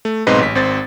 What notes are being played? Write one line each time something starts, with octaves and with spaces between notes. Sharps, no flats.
A3
B1 G#2 C4 B4 D#5 C6
A1 B6
G#1 C4 C5 A6